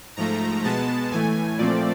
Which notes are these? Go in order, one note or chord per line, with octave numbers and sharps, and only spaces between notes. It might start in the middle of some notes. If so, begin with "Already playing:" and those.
G#2 F3 A3 A#5
B2 G#3 B3 A5
A2 E3 A3 G#5
A#2 F3 A3 C4 D5